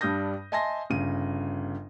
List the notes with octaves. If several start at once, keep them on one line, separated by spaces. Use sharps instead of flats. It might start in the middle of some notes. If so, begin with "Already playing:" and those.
G2 G3 D4 D#6 G6 A#6
D#5 E5 G#5 A5 C6 A#6
G1 C#3 D#7